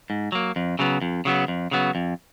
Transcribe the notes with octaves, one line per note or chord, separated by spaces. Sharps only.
G#2
F#3 A#3
F2
C#3 F#3 B3
F2
C#3 F#3 B3
F2
C#3 F#3 B3
F2